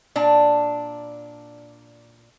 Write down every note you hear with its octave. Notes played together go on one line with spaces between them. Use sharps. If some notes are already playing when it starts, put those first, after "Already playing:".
A#2 D4 D5 A5